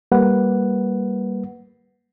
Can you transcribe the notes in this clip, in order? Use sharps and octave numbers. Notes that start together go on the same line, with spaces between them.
G3 A#3 B4 F#5